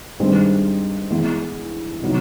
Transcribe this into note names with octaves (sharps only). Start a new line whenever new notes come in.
G2 D#3 G#3 C4
E3 G#3 B3 E4
C3 D#3 F#3 B3 D#4